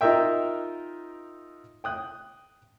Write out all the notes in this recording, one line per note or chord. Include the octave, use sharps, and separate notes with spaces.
D#4 F4 A#4 D#5 E5 G5
G5 D#6 F#6